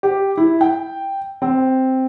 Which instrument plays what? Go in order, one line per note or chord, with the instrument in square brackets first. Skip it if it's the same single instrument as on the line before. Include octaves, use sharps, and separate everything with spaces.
[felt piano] G4
E4
G5
C4